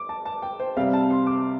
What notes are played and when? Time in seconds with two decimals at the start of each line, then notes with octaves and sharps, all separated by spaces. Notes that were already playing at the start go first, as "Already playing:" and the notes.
Already playing: D6
0.09 A5
0.25 A5
0.42 G5
0.60 C5
0.77 C3 G3 C4 F5
0.93 A5
1.10 C6
1.27 D6